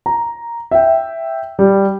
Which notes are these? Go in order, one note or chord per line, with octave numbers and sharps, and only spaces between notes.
A#5
E5 G5
G3